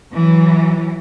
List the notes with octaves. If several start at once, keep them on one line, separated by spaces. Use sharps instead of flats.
E3 F#3